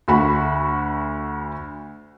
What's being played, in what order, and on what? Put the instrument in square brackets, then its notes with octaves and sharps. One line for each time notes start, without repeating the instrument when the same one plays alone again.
[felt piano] D2 F#4 B5